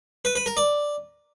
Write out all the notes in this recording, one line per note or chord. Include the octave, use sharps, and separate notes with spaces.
B4
B4
A#4
D5